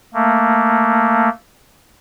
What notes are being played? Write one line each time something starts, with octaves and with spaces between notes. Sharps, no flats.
A3 A#3